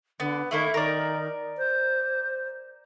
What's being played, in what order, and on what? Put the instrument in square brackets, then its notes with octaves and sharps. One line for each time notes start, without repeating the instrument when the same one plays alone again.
[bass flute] D3 [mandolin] B3
[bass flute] D#3 [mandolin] A3 A#3 E4
[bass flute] D#3 [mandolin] A#4 D5
[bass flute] C5